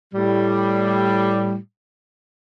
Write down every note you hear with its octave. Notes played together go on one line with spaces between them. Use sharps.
A2 G3